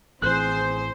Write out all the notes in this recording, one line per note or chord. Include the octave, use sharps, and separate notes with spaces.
A1 A2 E3 C4 G#4 C5 F#6